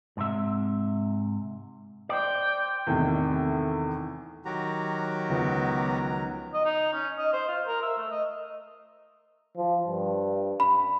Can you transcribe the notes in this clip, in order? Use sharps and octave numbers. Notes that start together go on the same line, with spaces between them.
G#2 C3 E5
C5 D5 G5
E2 A2 C3 D#3
D#3 F#3 F#4 G4 A#5
C#2 F3 B3
D#5
D#4
C#4
D#5
C5
F4
A#4
E5
A3
D#5
F3
G2
B5